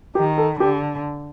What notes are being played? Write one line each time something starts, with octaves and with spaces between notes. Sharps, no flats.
D#3 G4
A4
D3 G4